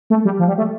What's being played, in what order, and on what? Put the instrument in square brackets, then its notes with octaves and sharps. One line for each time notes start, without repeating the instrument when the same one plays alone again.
[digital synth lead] A3
G3
F3
G3
A3